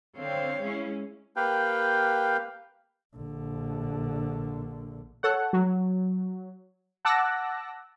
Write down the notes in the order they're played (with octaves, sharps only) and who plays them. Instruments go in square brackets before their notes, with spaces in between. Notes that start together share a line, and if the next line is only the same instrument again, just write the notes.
[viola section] D3 C4 [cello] C#5 F5
[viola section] G#3 C#4 E4
[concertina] A#3 G4 B4 F5 G5
[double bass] A#1 D3
[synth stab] A4 C#5 F#5
F#3
F#5 A5 D6 E6 F#6 A#6